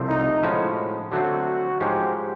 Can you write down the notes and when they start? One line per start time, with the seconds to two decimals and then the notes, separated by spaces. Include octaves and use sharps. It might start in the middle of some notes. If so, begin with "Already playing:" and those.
Already playing: C2 C3 F3 A3 C4
0.08 D#4
0.43 A2 F3 G#3 C#4 F#4
1.12 D3 F#3 A3 C4 F#4
1.80 G#2 F3 G#3 C#4 G4